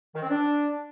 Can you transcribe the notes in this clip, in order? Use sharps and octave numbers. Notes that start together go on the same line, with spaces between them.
D#3
C4
D4